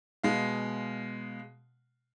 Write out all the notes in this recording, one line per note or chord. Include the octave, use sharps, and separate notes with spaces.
B2 G#3 F5